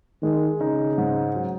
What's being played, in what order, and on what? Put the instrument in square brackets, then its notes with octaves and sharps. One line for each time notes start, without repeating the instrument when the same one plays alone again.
[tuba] D#3 [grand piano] G#3
[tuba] C#3 [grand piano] D#4
[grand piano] G#2
F#3